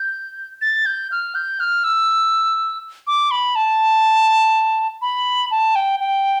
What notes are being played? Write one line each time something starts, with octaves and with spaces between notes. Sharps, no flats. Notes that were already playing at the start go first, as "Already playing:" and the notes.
Already playing: G6
A6
G6
F6
G6
F6
E6
D6
B5
A5
B5
A5
G5
G5